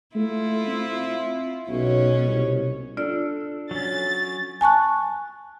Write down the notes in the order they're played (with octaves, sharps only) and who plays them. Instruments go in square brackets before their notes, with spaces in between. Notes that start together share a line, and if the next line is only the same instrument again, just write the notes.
[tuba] A3 [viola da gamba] E4 F4
[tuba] C4
[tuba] B1 [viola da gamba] B2 C#4 C#5
[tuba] C2
[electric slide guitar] D4 A4 [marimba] F4 D5
[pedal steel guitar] F#3 C#4 [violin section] A6
[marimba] G#5 A5 C#6 F#6